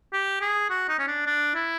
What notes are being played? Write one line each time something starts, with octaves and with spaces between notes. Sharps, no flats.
G4
G#4
F#4
D#4
C#4
D4
D4
E4